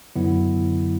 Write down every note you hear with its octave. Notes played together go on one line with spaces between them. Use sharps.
F#2 D3 F#3 B3 E4